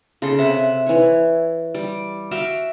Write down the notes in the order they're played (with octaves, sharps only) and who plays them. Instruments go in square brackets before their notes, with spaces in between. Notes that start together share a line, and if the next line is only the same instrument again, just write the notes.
[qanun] C#3 A4 C6
C3 E5 F#5
E3 C#5
G3
F#4 E5 F5 G5